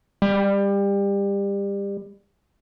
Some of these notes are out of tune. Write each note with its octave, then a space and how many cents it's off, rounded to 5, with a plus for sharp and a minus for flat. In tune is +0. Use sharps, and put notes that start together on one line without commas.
G3 +25